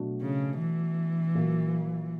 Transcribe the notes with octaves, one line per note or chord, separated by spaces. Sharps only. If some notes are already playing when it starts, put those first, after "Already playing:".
Already playing: B2 F#3 A3 D4 F#4
C#3
E3
A#2 F#3 A#3